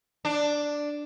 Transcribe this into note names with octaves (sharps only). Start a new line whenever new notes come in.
D4